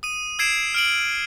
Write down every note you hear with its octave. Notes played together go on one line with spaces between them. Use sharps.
D#6 D#7
E6 G#6 C7 D7 E7
F6 D7 F#7